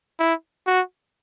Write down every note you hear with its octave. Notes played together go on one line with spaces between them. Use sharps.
E4
F#4